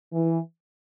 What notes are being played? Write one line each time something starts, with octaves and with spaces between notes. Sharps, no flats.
E3